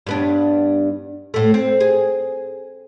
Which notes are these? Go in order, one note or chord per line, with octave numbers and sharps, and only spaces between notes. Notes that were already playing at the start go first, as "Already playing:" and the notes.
G2 B3 D4
A2 A3
C4
G#4